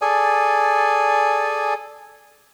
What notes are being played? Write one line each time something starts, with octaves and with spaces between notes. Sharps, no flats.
G#4 A4 D5 G#5